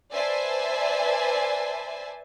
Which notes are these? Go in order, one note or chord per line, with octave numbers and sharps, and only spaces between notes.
B4 C5 D5 E5 G#5 A5